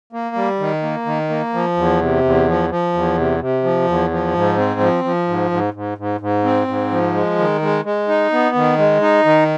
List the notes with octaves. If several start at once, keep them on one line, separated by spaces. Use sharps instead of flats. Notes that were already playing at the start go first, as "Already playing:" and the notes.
A#3
G3
D#3
A#3
D#3
A#3
F3
E2
C3
E2
F3
F3
E2
C3
C3
F3
E2
F3
G#2
C4
F3
F3
G#2
G#2
G#2
G#2
G#2
C4
G#2
F3
G#3
D#3
G#3
G#3
D#4
B3
D#3
G#3
D#4
D#3